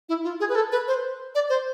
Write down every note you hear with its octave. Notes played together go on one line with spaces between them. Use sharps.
E4
F4
G#4
B4
A4
B4
C5
D5
C5